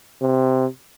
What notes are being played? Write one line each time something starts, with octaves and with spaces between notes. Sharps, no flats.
C3